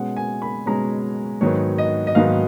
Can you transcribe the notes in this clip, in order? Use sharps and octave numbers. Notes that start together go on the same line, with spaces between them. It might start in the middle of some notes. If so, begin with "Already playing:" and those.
Already playing: B2 G#3 C#4 F#5
G#5
B5
B2 G#3 C#4 A#5
G#2 D#3 F#3 B3 D#4 C#5
D#5
D#5
G#2 D#3 F#3 B3 D#4 F5